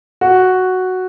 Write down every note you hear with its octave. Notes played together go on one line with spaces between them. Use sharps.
F#4